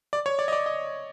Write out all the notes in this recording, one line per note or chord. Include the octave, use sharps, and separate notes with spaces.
D5
C#5
D5
D#5
D5
D#5